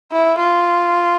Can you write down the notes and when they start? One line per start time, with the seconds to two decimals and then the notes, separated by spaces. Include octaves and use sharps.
0.12 E4
0.39 F4